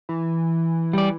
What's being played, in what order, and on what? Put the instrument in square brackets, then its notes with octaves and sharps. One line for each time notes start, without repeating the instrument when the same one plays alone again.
[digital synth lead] E3
[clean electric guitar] G3 D5